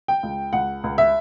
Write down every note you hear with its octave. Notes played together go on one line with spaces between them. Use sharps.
G5
C#2
C#2 F#5
C#2
E5